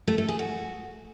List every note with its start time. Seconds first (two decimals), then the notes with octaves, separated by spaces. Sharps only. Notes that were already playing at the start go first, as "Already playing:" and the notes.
0.08 A3
0.18 A3
0.28 G#4
0.39 F#4